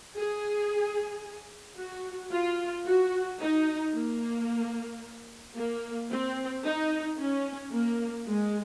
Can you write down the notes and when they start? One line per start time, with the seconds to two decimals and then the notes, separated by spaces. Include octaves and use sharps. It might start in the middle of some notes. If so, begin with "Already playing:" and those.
0.17 G#4
1.78 F#4
2.32 F4
2.86 F#4
3.41 D#4
3.94 A#3
5.57 A#3
6.10 C4
6.65 D#4
7.19 C#4
7.72 A#3
8.27 G#3